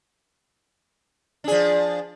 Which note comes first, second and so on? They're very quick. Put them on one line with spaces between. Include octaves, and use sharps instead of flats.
D4 G#4 F3